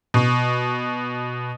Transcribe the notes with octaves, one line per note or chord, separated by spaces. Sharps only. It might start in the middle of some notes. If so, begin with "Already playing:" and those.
B2